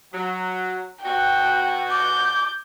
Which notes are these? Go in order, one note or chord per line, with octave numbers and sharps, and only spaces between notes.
F#3
B2 F#4 G5
D6 G6